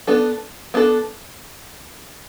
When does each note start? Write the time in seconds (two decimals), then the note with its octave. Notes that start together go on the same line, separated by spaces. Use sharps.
0.07 B3 D4 A4
0.74 B3 D4 A4